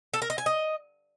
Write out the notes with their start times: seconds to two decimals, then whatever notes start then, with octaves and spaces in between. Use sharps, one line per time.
0.14 A4
0.22 A#4
0.30 D#5
0.38 G#5
0.46 D#5